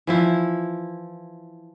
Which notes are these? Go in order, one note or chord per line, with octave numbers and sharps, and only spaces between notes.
E3 F3 E4